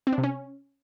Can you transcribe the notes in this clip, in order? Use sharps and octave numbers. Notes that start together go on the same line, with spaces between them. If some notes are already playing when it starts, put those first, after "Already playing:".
C4
D4
C3
C#4